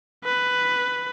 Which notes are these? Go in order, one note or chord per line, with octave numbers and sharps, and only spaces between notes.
B4